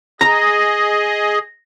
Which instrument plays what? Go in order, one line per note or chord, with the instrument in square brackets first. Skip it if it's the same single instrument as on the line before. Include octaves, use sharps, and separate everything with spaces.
[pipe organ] G#4 D#5 [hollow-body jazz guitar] A#5 [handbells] A#6